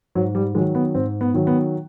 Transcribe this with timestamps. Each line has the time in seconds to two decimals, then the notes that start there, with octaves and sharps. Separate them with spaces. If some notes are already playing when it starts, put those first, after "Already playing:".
0.15 G#2 F#3
0.35 G3
0.55 D#3 F#3 G#3
0.75 B3
0.95 G#2 C4
1.21 B3
1.34 D#3 F#3
1.47 B3